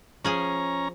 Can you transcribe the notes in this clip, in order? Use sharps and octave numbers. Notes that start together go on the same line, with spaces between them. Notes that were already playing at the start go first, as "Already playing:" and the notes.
F3 C#4 G#4 G#5 A#5